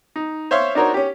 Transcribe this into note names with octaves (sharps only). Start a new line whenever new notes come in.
D#4
C5 C#5 E5 F5 C6 C#6
D4 D#4 F#4 A#4 C5 C#5
C#4 G4